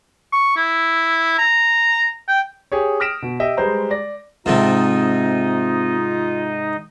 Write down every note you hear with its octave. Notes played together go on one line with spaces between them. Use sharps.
C#6
E4
A#5
G5
G4 G#4 C#5
D#6 F6 A#6 B6 D7 E7
B2
G4 D#5 E5
G3 G#3 B4 C5 A#5
D5 A#6
G#2 C3 C4 D#4 F4 A4 C5 D#5